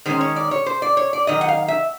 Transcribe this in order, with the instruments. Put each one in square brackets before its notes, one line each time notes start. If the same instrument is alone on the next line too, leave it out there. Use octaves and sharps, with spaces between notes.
[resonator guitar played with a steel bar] D#3 G#3 C#4 C5
C#5
D5
C#5
C5
D5
C#5
D5
D#3 F#3 D#5
F#5
F5
E5